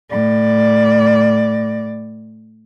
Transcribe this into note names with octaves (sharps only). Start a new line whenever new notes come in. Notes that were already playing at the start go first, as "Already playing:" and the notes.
A2 D5